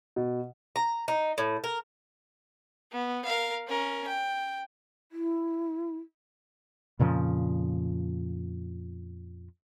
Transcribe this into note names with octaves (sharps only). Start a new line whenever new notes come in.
B2
A#5
D#4
A2
A#4
B3
A#4 F5
C#4 A#4
G5
E4
F2 A#2 C#3 F3